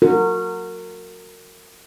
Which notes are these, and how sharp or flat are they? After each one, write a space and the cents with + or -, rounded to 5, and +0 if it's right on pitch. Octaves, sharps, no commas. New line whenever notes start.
F#4 -20 A#4 -30